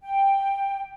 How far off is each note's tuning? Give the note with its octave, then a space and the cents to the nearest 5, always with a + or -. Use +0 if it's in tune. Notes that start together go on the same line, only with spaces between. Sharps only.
G5 +10